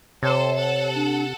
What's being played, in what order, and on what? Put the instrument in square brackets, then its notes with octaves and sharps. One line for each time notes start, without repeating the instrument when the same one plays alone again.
[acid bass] C3 [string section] A4 C5 [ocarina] C#5
[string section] A4 F#5
[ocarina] D4